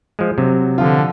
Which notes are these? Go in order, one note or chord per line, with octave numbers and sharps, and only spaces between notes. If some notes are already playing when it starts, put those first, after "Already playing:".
F3 G#3
C3 F#3
D3 F3 F4